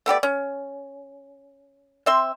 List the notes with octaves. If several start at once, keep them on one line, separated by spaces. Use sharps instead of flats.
A3 B3 G4 D5
C#4
C4 E5 C6